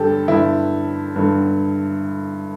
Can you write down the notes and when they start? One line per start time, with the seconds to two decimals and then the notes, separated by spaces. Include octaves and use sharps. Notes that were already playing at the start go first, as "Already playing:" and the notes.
Already playing: G2 D3 G4 A4
0.28 G2 D3 E4
1.16 G2 D3